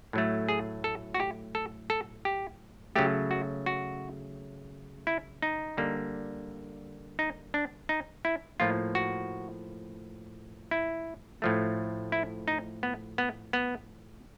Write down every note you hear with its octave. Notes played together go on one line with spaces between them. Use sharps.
A2 F#3 A3
G#4
A4
F#4
G4
A4
A4
G4
C#3 F#3 A3 G4
F#4
F#4
E4
D#4
D3 G3 A#3
D#4
D4
D#4
E4
A2 F3 A#3 F4
F#4
E4
A2 F3 A3
E4
D#4
B3
B3
B3